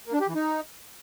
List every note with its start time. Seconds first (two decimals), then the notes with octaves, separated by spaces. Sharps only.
0.06 A#3
0.13 D4
0.21 G4
0.28 E3
0.35 D#4